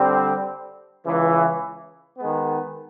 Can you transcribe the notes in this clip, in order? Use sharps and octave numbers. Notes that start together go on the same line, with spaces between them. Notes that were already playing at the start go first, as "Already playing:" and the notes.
Already playing: D3 G3 C4
C#2 C#3 E3
D#3 G#3 B3